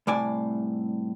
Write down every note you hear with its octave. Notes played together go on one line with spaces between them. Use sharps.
C2 A2 D5 G#5